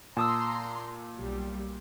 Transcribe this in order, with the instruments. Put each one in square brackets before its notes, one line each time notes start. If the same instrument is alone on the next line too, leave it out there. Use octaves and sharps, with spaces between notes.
[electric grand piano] A#2 [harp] A5 D#6 E6 [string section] A#5 C6
[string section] B1 G3